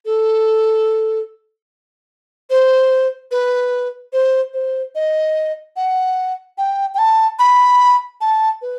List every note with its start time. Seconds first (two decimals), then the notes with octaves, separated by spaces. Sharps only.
0.05 A4
2.50 C5
3.31 B4
4.13 C5
4.54 C5
4.95 D#5
5.76 F#5
6.58 G5
6.94 G5
6.98 A5
7.39 B5
8.21 A5
8.62 B4